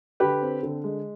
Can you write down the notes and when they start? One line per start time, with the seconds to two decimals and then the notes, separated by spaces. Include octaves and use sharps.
0.20 D3 G4 B4
0.42 C4
0.63 D3
0.84 G#3